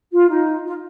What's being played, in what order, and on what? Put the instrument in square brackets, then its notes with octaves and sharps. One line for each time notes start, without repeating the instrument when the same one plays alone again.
[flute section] F4
D#4
F4